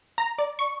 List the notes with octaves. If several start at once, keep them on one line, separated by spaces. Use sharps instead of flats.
A#5
D5
C#6